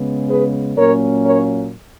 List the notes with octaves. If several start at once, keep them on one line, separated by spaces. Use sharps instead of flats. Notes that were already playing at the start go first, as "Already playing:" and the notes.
Already playing: C#3 G#3 B3
G#4 B4
A#2 F#3 A#3 C#4 A#4 C#5
A#4 C#5